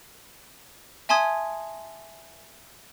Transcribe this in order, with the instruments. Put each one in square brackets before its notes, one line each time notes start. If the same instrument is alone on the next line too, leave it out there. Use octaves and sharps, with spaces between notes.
[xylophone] E5 G#5 A5 C6 D#6 G#6